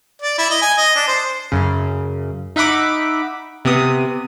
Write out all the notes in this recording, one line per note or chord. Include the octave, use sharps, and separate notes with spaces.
D5
E4
D#5
G#5
D#5
D4
C5
F#2 C#3
D#4 E5 F#5 B5 D6
C3 B3 D#6